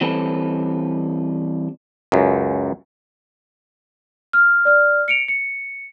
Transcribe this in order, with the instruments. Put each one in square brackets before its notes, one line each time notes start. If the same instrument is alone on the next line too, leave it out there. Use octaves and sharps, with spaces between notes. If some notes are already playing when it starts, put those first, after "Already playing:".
[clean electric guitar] E3 G3 C4 C#4 A4 B4
[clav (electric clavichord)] C#2 F#2
[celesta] F6
D5 F6
C#7 D7 F7
C#7